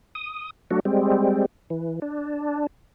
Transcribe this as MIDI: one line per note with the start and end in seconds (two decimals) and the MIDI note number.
0.15 0.50 87
0.71 0.80 54
0.71 0.80 57
0.71 0.80 62
0.71 0.80 66
0.85 1.46 55
0.85 1.46 56
0.85 1.46 60
1.70 1.99 52
2.02 2.67 62